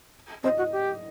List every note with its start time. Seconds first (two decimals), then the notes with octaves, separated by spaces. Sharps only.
0.43 C4 D#5
0.57 F#4
0.72 G4